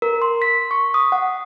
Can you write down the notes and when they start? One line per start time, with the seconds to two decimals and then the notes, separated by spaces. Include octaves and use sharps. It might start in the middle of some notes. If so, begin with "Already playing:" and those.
0.02 A#4
0.22 C6
0.42 B6
0.71 C#6
0.94 D#6
1.12 F#5